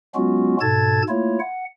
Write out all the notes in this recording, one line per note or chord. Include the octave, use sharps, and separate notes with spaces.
F#3 G#3 B3 C#4 F4 F#4
G#2 B2 A4 A5 G#6 A6
A3 A#3 E4 F4 C#5
F#5